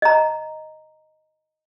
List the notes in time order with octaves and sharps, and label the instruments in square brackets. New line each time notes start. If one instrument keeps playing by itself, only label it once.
[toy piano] D#5 A#5